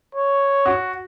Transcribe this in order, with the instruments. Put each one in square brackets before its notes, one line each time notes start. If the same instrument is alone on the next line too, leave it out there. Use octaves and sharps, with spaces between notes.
[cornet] C#5
[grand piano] F#4